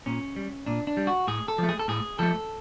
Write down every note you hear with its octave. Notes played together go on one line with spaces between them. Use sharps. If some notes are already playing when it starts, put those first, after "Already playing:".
A#2 C#4
G3
A#2 D4
D4
G3
F#4
A2 G#4
A4
F3 A3
G#4
A4
A2 G#4
F3 A3 A4